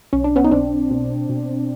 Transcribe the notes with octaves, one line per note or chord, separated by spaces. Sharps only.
B1 C#4
D4
B3 C#4
D#4
B1 C4 D4
B2
B2